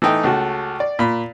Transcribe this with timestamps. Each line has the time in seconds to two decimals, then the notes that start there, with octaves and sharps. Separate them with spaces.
0.02 E3 A3 D#4 G5
0.24 C#2 A3 F#4
0.80 D5
0.99 A#2 B5